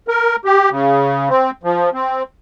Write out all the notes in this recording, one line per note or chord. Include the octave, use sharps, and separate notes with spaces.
A#4
G4
C#3
C4
F3
C4